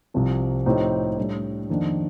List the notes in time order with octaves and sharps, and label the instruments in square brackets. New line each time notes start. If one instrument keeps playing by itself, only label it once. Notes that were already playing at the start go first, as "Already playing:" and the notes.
[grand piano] C2 C3 F3
A2 F3 C4 D#4 G4
A2 G3 D4
F2 D#3 A#3 D4